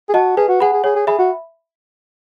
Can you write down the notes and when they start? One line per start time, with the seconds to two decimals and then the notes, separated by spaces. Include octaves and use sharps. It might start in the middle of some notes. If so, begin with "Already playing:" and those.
0.09 G#4
0.14 F#4 D#5 A5
0.37 G#4 B4
0.48 F#4
0.60 G#4 F#5 B5
0.72 G#4
0.84 G#4 C#5
0.95 G#4
1.07 G#4 E5 B5
1.18 F#4